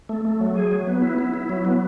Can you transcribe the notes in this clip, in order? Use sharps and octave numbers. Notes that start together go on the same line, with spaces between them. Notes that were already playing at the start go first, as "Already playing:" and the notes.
A3
A3
F#3
G#4
F#3
B3
E4
E4
E4
F#3
B3